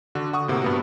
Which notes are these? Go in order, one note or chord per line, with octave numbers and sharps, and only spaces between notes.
D3 F#4
F#5 C#6 D#6
A2 C3 A#3
G2 B3 F#4